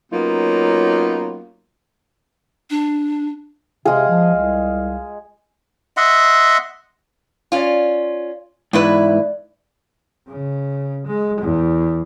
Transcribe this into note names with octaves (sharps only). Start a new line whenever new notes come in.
F#3 A#3 B3 C#4 D#4 F4
D4
C3 G#3 G#4 F5 F6
F3
C2
D#5 E5 F#5 C6
C#4 F4 D5 F5
E2 G#2 E4 B4 D5
C#3
G#3
E2